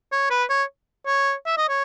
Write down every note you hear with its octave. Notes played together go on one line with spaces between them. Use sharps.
C#5
B4
C#5
C#5
E5
D#5
C#5